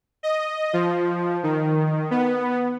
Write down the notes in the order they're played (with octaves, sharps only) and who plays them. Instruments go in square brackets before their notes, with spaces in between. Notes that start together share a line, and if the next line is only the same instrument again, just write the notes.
[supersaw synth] D#5
F3
D#3
B3